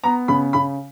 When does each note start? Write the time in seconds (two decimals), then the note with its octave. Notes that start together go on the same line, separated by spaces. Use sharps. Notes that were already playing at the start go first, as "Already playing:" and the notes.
0.04 B3 A#5
0.28 C#3 B5
0.53 C#3 B5